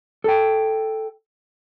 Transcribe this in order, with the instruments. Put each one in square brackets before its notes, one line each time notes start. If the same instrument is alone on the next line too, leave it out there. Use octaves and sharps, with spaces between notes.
[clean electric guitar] A4 G5